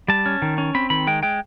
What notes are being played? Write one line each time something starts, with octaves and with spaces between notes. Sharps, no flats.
G3 A5
C#4
D#3
C#4
C4 B5
D#3 B5
G#3 G5
G#3 G5